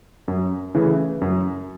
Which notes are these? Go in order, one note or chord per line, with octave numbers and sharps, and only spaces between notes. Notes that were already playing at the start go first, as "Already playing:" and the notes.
F#2
C#3 E3 A3
F#2